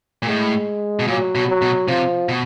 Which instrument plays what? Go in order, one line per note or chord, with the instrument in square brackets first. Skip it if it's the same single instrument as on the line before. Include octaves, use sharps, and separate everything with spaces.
[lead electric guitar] A#2
[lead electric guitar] A2 [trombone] G#3
[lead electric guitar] B2
[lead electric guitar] A#2 [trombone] F#3
[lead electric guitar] B2
[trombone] F#3
[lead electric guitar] B2
[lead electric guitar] C3 [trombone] F3
[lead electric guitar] B2